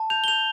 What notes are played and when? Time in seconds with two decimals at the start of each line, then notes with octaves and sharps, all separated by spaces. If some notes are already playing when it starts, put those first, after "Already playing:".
Already playing: A5
0.10 G6 F7
0.24 G7
0.28 G6 F7